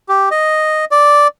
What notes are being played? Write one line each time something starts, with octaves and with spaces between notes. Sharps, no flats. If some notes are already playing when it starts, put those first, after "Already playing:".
G4
D#5
D5